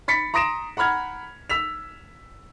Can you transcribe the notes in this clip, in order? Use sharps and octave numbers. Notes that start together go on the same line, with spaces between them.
B5 A6 B6 C#7
A#5 C6 D#6 A#6 D7 E7
F#5 A#5 B5 F6 G#6
E6 B6 F7